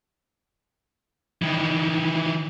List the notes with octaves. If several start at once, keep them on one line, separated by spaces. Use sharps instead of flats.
D#3 E3